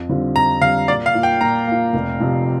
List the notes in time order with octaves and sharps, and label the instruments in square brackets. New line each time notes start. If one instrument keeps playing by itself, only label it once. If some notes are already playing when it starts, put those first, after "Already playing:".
Already playing: [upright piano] F2
D3 G3 C4 F4
[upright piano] F2 [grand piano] A#5
[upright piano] D3 G3 C4 F4 [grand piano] F5
[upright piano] A#2 [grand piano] D5
[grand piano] F5
[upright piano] A#3 F4
[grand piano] G5
[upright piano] A#2 [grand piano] A#5
[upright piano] A#3 F4
F1
F2 C3 F3